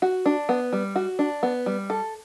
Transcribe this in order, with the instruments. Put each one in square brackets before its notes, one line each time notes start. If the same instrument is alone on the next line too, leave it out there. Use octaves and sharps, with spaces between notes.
[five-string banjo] F#4
D4
B3
G3
F#4
D4
B3
G3
A4